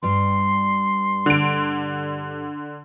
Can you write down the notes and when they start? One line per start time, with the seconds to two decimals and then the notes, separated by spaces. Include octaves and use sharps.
0.03 G2 G3 C6
1.26 D3 D7